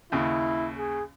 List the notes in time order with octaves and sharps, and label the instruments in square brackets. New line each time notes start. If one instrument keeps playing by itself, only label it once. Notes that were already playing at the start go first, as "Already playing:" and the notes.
[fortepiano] D#2 C#3 [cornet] E4
[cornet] G#4